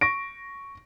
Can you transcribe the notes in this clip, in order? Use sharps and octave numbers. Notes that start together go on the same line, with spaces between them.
C#6 A#6 D7